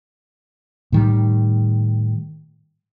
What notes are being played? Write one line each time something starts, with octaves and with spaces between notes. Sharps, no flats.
A2 D#3 G3